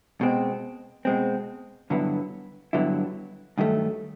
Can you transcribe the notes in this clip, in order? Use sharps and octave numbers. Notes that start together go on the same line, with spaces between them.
B2 G#3 C4
B2 G#3 C4
G2 D3 F#3 B3 E4
G2 D3 F#3 B3 E4
G2 D#3 F#3 A3